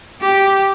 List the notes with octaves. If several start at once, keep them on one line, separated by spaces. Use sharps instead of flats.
G4